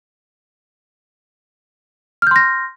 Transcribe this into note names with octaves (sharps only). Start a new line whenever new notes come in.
C6 F6 G6 A#6